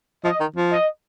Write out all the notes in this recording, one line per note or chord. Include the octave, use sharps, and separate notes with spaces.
F3 D#5
D#3
F3
D#5